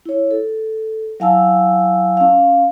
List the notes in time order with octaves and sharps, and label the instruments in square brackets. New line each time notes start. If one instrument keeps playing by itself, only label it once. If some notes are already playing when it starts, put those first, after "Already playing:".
[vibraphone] E4 C#5
A4
F#3 E4 F5 G#5 A5 E6
C#4 F5